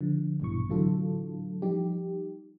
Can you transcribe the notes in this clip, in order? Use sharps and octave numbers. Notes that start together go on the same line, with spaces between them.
D3 F3
A#1 G2 B2 E3 C#6
A2 D3 E3 F#3 F4 A4
F3 G3 D#4 G4